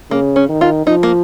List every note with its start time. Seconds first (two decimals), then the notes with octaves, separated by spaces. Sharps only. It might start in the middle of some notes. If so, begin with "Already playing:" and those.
0.11 C#3 A#3
0.36 C#4
0.49 D#3
0.61 F4
0.86 F3 D#4
1.03 A#3